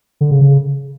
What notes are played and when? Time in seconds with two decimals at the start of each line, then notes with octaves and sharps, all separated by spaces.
0.21 D3
0.31 C#3
0.41 C#3